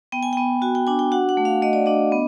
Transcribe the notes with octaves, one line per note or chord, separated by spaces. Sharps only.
B3 G5
G#5
B3 G5
F#4 G#5
G5
D4 G#5
G5
F#4 F#5
F#5
A3
F5
A3 D#5
D5
D4 D#5
B3